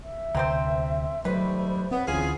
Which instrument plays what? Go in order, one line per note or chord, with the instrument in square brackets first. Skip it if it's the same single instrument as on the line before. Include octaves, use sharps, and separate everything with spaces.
[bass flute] E5
[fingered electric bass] D2 C3 [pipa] F#3 C4 C5
[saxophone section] D#3 G3 A3 [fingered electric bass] F#3 [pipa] B4 [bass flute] C5
[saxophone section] B3 [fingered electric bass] C4 [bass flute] C#5
[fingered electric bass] D2 [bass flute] E3 [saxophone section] C#4 F4 G#4